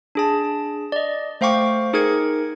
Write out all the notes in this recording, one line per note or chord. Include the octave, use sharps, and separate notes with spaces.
D4 G#4 A5
D5 D#5
A3 C5 F5 G5 C#6 D6
D#4 G#4 A#4 G#6 C#7